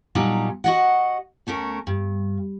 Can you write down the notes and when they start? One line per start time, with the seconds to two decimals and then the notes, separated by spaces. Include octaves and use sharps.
0.15 A#2 F#3 G3 D4 D#4
0.64 F#4 D#5 F#5
1.47 D2 A3 C#4 A#4
1.87 G2